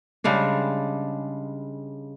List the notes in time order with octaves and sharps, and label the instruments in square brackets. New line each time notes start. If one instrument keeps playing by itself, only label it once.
[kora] C#3 G3 G#3 D4